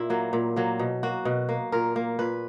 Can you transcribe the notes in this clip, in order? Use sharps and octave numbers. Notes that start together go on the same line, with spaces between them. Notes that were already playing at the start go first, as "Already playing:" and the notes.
Already playing: A#2 E4
F#3 A#3
A#2
F#3 A#3
B2
A#3 F#4
B2
A#3
A#2 A#4
A#3
A#2 B4